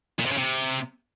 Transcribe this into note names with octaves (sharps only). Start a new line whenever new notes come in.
A#2
C3
C#3
C3